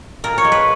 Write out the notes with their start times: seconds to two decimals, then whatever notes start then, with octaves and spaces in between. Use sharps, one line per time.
0.24 A#2 A#4
0.38 C#5
0.45 G#3
0.52 B4